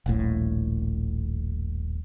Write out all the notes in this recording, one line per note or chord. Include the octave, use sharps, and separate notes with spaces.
D#1 A#1 A2